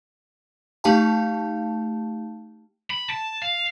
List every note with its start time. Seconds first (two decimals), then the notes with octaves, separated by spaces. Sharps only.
0.84 A3 D#4 G4 F5 G5 A5
2.90 B5
3.10 A5
3.42 F5